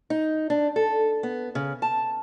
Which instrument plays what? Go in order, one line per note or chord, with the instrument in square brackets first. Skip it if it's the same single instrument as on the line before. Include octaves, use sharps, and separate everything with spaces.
[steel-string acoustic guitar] D#4
D4
A4
B3
C#3
A5